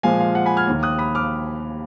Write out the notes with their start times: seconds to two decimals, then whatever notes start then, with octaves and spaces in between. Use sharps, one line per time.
0.03 A#2 F3 G#3 F5 G#5
0.20 F5
0.35 F#5
0.46 G#5 B5
0.57 F6 G#6
0.67 D#2 D#3 A#3
0.83 D#6 F#6
0.99 B5 D#6
1.15 D6 F6